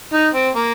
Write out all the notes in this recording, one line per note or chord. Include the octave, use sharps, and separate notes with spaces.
D#4
C4
A#3